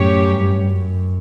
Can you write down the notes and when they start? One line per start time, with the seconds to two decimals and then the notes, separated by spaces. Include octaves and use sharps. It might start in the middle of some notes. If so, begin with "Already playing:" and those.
Already playing: F#2 A2 F#3 C#4 G4 C#5
0.29 G2
0.69 F#2